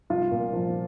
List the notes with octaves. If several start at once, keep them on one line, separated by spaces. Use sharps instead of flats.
C2 F4
A#2
F3